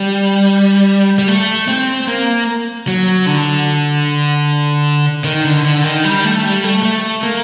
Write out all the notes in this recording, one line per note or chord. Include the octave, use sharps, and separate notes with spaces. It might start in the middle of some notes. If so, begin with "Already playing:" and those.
Already playing: G3
G3
A3
C4
A#3
F#3
D3
D#3
D3
D3
D#3
G3
A3
G3
A3
A3
A#3